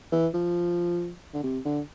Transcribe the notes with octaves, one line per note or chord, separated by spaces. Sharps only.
E3
F3
D3
C3
D3